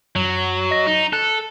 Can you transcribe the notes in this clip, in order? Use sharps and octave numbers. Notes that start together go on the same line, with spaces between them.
F#2 F#3
D#5 A#6
D#4
A4 F#6